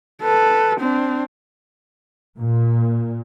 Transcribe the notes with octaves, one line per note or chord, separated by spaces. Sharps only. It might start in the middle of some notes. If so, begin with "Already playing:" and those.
A4 B4
C4 D4
A#2